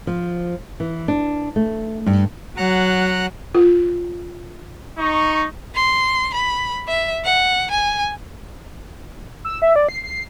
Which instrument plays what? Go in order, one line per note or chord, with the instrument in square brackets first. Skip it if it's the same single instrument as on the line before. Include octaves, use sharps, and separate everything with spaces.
[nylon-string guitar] F3
E3
D4
A3
G2
[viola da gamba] F#3 [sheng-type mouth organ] F#5 A#5 F#6
[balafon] F4
[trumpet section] D#4 C#6
[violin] C6
B5
E5
F#5
G#5
[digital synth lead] E6
E5
D5
C7
C7